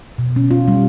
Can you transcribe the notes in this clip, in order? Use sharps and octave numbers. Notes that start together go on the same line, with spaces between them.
B2
C#4
F4
G3